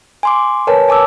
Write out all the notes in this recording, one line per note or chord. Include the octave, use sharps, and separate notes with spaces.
G#5 C6 D6
A#4 B4 C#5 G#5 A5
G#5 A5 D6 E6